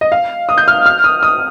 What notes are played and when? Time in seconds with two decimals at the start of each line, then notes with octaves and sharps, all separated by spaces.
0.01 D#5
0.12 F5
0.49 D#6
0.58 G6
0.68 F6
0.86 F6
1.04 D#6
1.23 D#6